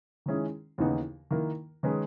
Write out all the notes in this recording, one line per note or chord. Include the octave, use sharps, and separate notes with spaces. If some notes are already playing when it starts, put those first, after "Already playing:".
D#3 G#3 C#4 E4 G#4
D#2 C#3 E3 B3 D#4
D#3 A#3 E4 A#4
D#3 G#3 C#4 G#4 B4